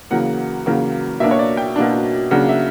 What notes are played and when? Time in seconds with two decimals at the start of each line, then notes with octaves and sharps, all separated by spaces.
0.11 E2 C#3 F#3 A#3 F#5
0.66 E2 C#3 F#3 A#3
1.20 B2 A#3 D4 E5
1.31 C#5
1.39 D5
1.57 G5
1.76 B2 A#3 D4
2.31 C#3 F#3 A#3 D4 F#5
2.49 E5